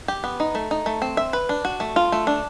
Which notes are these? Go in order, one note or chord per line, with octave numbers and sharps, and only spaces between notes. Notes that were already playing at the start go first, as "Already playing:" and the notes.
G4
B3
D#4
A3
D#4
A3
C4
E5
B4
D4
F#4
A3
F4
A3
D4